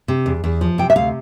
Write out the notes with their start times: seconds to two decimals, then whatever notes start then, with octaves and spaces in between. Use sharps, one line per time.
0.08 C3
0.26 E2
0.44 E2
0.61 F3
0.78 C3 G5
0.90 E5
0.96 D2 F5